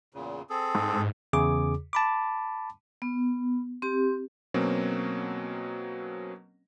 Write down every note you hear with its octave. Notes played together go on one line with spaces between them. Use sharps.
E2 A#2 C#3
C4 G#4 A4
G#2
E2 C#3 G#4 D6
A5 B5 D6
B3
C4 G4
B2 F#3 A#3 C4 C#4